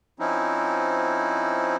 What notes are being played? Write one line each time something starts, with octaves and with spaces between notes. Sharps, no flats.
F3 C4 C#4 D#4 E4